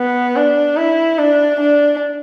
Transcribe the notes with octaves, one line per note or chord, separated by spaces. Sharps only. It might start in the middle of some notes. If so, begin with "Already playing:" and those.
Already playing: B3
D4
E4
D4
D4